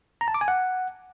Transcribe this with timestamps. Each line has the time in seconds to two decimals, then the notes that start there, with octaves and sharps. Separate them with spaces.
0.21 A#5
0.28 A5
0.34 D6
0.41 G#5
0.48 F#5